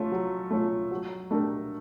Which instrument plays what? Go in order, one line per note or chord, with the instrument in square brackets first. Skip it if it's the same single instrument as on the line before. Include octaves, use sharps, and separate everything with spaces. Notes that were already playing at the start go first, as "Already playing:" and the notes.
Already playing: [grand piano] A3 C#4 F4
F#3
A3 C#4 F4
F#3
A3 D4 G4 A#4